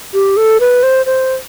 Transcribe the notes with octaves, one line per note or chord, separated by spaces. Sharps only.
G4
A4
B4
C5
C5